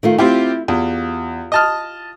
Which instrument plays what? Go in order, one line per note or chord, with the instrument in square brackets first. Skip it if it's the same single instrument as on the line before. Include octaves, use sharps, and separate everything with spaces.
[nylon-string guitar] D#3 A3 F4
[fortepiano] C4 F4 G4 [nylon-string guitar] E4
[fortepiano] E2 [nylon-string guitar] F4 G4
[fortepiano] D#5 A5 F6